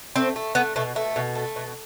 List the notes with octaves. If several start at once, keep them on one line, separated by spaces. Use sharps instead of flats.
A3 C4
A3
A3 B3
B2 A3
B2 A3
B2
A3
B2